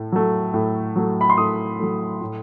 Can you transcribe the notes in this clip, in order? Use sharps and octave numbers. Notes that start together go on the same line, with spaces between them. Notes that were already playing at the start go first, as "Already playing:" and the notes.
Already playing: A2 A3
F#3 A3
A2
F#3 A3
B5
C6
A2 D#6
F#3 A3
A2